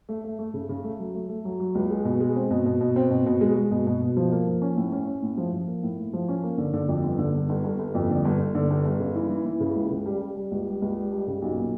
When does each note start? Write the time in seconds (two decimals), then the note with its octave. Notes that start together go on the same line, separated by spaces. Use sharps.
0.09 A3
0.24 A3
0.39 A3
0.54 C#3
0.69 C#3
0.84 A3
0.99 F#3
1.15 A3
1.29 A3
1.45 F#3
1.60 F#3
1.75 C#2
1.90 G#3
2.05 B2
2.20 G#3
2.36 C4
2.51 B2
2.66 B2
2.81 B2
2.96 C4
3.10 B2
3.26 B2
3.41 G#3
3.56 G#3
3.71 B2
3.87 B2
4.01 B2
4.17 F3
4.32 A#3
4.47 F3
4.62 C#4
4.77 A2
4.92 C#4
5.07 C#4
5.22 A2
5.37 F3
5.53 F3
5.68 A#3
5.83 A2
5.98 A2
6.13 F3
6.28 C#4
6.43 A#3
6.58 D3
6.73 D3
6.89 F2
7.04 G1
7.19 D3
7.34 G1
7.49 G1
7.64 G1
7.79 G1
7.95 F2
8.09 D3
8.25 G1
8.40 G1
8.55 D3
8.70 G1
8.85 G1
9.00 C#3
9.15 E3
9.30 E3
9.45 E3
9.60 C#3
9.76 C#2
9.91 C#3
10.06 G3
10.21 G3
10.36 G3
10.51 C#2
10.67 G3
10.82 C#2
10.96 G3
11.12 G3
11.27 C#3
11.42 B1
11.57 A#2